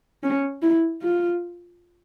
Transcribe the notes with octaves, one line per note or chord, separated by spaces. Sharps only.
C#4
E4
F4